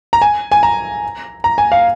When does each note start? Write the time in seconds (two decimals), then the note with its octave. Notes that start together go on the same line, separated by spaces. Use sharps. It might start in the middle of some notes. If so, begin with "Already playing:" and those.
0.13 A#5
0.22 G#5
0.52 G#5
0.63 A#5
1.44 A#5
1.58 G#5
1.72 F5